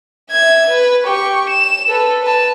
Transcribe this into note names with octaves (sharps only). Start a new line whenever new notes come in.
E5 G#6
B4
G4 C#6
E7
A4 B4
B4 A5